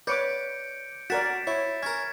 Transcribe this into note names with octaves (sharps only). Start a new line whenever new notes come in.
B4 C#5 D5 D6 G6 C#7 D7
F#4 A#4 D5 F#5 G#5 A6 B6 E7
E4 C#5
C#4 A#4 G#6